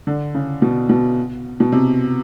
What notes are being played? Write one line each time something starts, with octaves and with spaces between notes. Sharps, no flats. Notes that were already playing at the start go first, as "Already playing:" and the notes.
D3
C#3
B2
B2
B2
C3